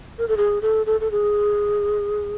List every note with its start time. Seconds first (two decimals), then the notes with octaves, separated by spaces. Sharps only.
0.19 A#4
0.28 A4
0.37 G#4
0.62 A4
0.86 A4
1.01 A4
1.11 G#4